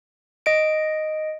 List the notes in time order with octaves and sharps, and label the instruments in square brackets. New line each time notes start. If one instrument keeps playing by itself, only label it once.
[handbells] D#5 D7